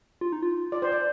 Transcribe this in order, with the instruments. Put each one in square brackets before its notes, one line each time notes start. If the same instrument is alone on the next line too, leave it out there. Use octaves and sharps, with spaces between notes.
[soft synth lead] F4
D#4
F4
[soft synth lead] F4 [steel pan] D5
[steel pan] C5
D5